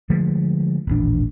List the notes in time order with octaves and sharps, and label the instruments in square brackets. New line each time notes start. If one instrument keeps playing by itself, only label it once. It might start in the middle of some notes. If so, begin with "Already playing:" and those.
[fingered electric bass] D3 F3 G#3 A3
D#1 A1 D4